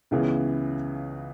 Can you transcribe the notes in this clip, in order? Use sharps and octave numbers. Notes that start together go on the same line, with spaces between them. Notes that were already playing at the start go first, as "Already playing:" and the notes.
C#2 C#3 E3 B3